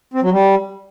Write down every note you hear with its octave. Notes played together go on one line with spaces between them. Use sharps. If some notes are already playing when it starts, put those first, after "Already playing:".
C4
F#3
G3